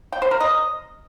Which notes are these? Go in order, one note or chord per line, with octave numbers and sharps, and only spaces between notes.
G5
C5
A#4
D#5